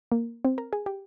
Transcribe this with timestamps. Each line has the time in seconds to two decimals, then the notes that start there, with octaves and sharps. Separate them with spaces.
0.12 A#3
0.45 C4
0.58 A#4
0.73 G#4
0.86 G4